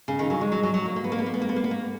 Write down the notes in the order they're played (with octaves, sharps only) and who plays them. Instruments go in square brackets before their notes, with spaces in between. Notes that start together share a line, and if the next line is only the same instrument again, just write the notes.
[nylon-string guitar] C#3
D#3
F#3
G#3
F#3
F#3
F#3
A#3
A#3
B3
A#3
B3
A#3
B3
A#3
B3
A#3
B3
A#3